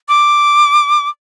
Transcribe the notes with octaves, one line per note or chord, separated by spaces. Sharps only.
D6